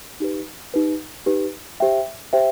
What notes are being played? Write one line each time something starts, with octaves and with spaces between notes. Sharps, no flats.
D#4 G4 B4
D#4 G4 B4
D#4 G4 B4
G4 C5 E5 G5
G4 C5 E5 G5